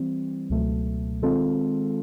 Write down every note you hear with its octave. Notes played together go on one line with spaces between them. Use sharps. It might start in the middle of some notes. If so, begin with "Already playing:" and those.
Already playing: E3 G3 C4
C#2 B2 F#3 A3
D#3 G#3 C4 F4 A4